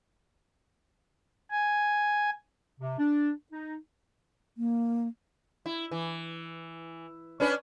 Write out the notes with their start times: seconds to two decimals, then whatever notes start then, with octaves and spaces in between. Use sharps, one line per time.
1.51 G#5
2.80 C3
2.99 D4
3.53 D#4
4.57 A#3
5.66 E4
5.91 E3
7.40 C#4 D4 B4